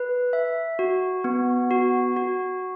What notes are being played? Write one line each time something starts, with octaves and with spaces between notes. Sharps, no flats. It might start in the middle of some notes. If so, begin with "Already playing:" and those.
Already playing: B4
E5
F#4
B3
F#4
F#4